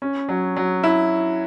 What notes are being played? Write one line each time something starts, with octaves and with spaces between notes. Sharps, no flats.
C#4
F#3
F#3
E4